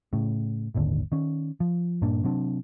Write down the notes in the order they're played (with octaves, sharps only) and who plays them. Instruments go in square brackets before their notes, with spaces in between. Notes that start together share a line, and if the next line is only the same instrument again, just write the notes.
[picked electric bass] A2 C#3
D#1 G#1 D#2 D3
D#3 C#4
F3
G2 A#2 A#3 D4
C3 F#3 C4 D4